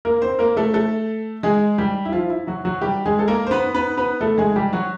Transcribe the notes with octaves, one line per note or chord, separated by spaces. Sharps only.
A#3 A#4
C4 C5
A#3 A#4
A3 A4
A3 A4
G#3 G#4
G3 G4
E4
F3 F4
E4
F#3 F#4
F#3 F#4
G3 G4
G#3 G#4
A4
A#3 A#4
C5
B3 B4
B3 B4
B3 B4
A3 A4
G#3 G#4
G3 G4
F#3 F#4